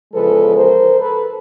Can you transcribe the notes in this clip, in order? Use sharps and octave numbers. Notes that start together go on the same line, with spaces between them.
E2 C#3 F3 G#3 A4 B4
A#4 C5
A4 B4